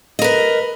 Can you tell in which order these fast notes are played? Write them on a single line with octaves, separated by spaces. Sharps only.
D#5 A#4 B4